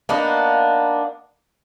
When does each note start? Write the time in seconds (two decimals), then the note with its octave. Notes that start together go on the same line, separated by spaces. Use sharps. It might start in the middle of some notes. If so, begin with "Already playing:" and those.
0.09 A#3 B3 D4 D#4